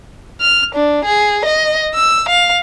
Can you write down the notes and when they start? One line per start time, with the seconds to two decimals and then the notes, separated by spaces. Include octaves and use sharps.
0.40 F6
0.75 D4
1.05 G#4
1.45 D#5
1.95 E6
2.29 F5